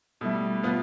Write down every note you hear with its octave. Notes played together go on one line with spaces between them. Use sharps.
B2 G3 A3 E4
B2 B3 F4